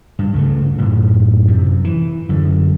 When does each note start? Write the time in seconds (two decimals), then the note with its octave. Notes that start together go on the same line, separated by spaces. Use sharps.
0.19 G2
0.34 C#2 C#3 F#3 A3
0.78 F#2 A2
1.47 F#2 C3
1.84 E3
2.29 F#2 D3